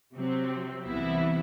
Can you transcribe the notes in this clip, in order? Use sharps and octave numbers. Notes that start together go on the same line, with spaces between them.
C3 F#3 C4
C2 C3 E3 B3 E4